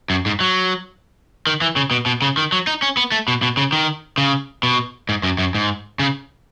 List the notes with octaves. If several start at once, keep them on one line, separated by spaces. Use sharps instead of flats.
F#2
G#2
F#3
D#3
E3
C#3
B2
B2
C#3
D#3
F#3
D#4
C#4
B3
A3
B2
B2
C#3
D#3
C#3
B2
G#2
F#2
F#2
G#2
C#3